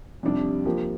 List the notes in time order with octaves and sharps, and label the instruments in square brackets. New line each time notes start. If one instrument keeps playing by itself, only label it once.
[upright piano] F2 C3 G3 D4
F3 A#3 G4